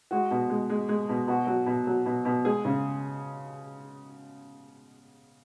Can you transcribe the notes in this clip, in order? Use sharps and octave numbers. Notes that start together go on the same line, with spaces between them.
G#3 F#4
B2
G#3
G#3
G#3
B2
B2 F#4
F#3
B2
F#3
B2
B2
G#3 G#4
C#3